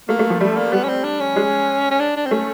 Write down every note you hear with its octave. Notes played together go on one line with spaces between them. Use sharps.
A3 A#3
A3
F3
G3 A3
A#3
G3 B3
C#4
C4
D4
C#4
G#3
C#4
D4
D4
C4
A3 C#4